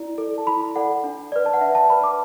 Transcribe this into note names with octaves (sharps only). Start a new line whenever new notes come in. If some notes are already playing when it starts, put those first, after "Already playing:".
Already playing: E4 D5
A4 D5
A5
E4 B5
A4 D5 F#5
D4
B4 D5
A5
F#5
D4 E5
A5
B4 D5 B5
D6